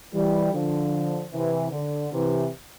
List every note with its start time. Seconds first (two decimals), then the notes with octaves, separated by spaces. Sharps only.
0.13 E3 G3
0.53 D3 F3
1.32 C3 E3
1.71 D3
2.11 C3 E3